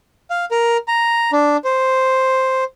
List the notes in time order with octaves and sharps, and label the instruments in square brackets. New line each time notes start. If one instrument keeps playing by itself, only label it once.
[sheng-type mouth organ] F5
A#4
A#5
D4
C5